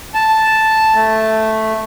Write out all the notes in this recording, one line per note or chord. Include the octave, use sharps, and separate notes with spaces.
A5
A3